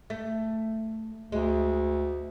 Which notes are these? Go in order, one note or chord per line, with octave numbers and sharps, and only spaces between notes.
A3
D2 G#3